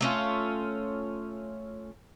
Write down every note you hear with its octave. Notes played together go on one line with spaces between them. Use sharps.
A3 C#4 F4